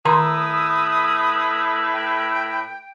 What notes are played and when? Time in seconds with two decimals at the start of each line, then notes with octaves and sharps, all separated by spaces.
0.05 A2 D#3 B4 E5 A#5 C6 D#6
1.92 G5